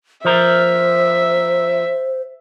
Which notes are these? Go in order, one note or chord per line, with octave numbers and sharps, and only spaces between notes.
F3 A#4 C5 E5